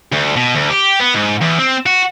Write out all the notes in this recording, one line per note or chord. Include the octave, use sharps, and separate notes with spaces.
D2
B2
D2
G4
B3
G#2
E2
C4
F#4